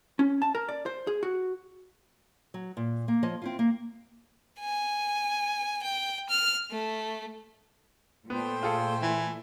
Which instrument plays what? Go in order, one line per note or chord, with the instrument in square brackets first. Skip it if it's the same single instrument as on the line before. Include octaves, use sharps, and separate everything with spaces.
[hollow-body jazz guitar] C#4
A5
A#4
D5
C5
G#4
F#4
[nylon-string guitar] F#3
A#2
A#3
F3 C#5 D#5
C4 E4 F4
A#3
[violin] G#5
G5
F6
A3
[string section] A#2 A3 [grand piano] B3 [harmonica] C5 G5
[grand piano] F4 G#4 A4
[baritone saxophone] E3 [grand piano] E4